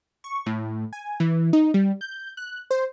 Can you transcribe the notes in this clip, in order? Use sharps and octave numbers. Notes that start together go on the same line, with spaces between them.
C#6
A2
G#5
E3
D#4
G3
G6
F#6
C5